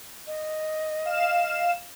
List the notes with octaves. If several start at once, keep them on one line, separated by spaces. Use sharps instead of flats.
D#5
F5 E7